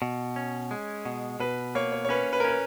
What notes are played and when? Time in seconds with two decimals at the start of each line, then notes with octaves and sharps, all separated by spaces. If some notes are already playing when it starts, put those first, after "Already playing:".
0.02 B2
0.36 C#4
0.71 G#3
1.05 B2
1.40 B2 B4
1.75 A#3 C#5
1.92 C#5
2.05 C#5
2.09 C#4 B4
2.33 B4
2.40 A#4
2.44 C#4 B4